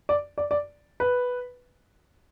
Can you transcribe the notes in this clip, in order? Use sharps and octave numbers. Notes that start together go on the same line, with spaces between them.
D5
D5
D5
B4